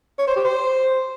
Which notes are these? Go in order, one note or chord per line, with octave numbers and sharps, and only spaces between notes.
C#5
C5
G4
C5